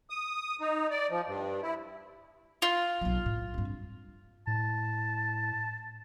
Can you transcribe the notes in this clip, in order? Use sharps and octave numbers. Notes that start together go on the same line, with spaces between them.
D#6
D#4
D5
F3
G2
E4
F4
B1 F#3
A2
C2 G2
A2 A5